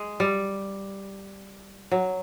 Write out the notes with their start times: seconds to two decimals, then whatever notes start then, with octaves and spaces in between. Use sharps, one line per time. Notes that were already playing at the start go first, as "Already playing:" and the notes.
Already playing: G#3
0.20 G3
1.91 F#3